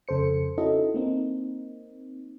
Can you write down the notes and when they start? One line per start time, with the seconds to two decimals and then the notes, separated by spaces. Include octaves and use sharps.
0.08 F2 C#3 A4 C5 C#7
0.58 C#4 D#4 E4 F#4 A4 D#5
0.94 A#3 C4 D#4